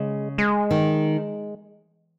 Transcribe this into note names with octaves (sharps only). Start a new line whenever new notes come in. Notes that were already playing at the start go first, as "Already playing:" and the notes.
Already playing: C#3 G#3
G#3
D#3